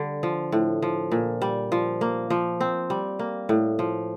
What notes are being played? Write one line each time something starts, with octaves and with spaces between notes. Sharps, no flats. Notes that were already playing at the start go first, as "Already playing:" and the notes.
Already playing: D3 G3
F3
A2
F3
A#2
G3
F3
A#3
F3
C4
G3
A#3
A2
F3